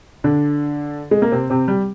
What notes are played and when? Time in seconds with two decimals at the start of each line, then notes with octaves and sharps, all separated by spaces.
0.24 D3 D4
1.11 G#3
1.22 A#3
1.32 C3 C4
1.50 C3 C4
1.68 G3